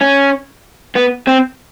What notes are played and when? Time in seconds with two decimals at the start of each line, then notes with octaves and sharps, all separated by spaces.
0.01 C#4
0.96 B3
1.28 C4